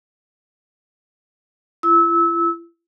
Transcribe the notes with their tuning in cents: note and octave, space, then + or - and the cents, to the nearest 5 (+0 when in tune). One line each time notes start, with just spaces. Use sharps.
E4 +45 E6 -25